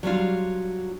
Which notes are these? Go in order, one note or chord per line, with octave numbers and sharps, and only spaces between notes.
F#3 G3 D4 F4